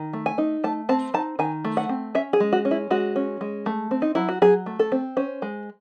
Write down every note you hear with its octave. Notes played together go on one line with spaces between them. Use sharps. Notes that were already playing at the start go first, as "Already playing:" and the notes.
Already playing: D#3
A3
G#5
D#4
A3 A5
C4 A5
D#4 A5
D#3 G#5
A3
F#5
C4
C#4 E5
G#4
G#3
F#4
C#4
E4
G#3 F#4
C#4
G#3
A3
C4
D#4
F#3 E4
F#4
F#3 G#4
A3
A4
C4
C#4 C5
G#3